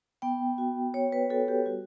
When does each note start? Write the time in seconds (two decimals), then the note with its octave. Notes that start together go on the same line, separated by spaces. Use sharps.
0.22 B3 G5
0.58 F#4
0.94 B3 C#5
1.12 B4
1.30 F#4 A4
1.48 G4
1.66 G3 F#4